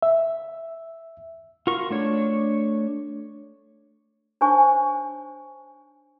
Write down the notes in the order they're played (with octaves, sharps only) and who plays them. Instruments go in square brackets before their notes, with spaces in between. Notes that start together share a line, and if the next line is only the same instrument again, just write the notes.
[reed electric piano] E5
[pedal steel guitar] F4 F#4 A#4 C#6
A3 D4 C#5
[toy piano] D4 D#4 C5 C#5 G#5 C#6